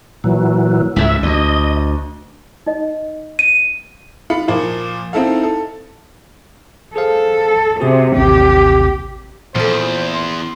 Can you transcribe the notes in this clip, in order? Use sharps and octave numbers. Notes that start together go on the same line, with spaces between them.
A#2 E3 F#3
C#2 G#2 E5
D2 D#5
D#4 D#5
D#7
F4 B5 C#7
A#2 F3 A#3 F4
C4 D#4 E4 A4 F5
A4
G#4 A4 C5 F5
C3 F#4 G#4
A1 D#2 C3 G4
E2 A#2 F3 C#4 A4 C5
C6